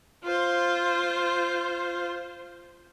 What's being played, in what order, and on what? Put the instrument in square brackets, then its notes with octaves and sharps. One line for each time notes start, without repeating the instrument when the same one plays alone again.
[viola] F4 C5